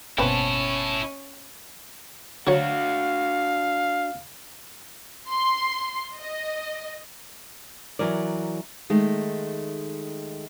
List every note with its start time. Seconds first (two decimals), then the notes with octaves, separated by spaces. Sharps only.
0.18 G1 B2 A#3 C4 C#4 E4 B4 A5
2.47 D3 F#3 D4 F#4 C#5 F5
5.29 C6
6.18 D#5
7.99 E3 F#3 A#4 D5
8.90 D#3 G#3 A3 D#4